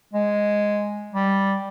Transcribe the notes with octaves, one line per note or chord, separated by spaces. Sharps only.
G#3
G3